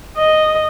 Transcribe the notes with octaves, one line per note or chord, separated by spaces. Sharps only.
D#5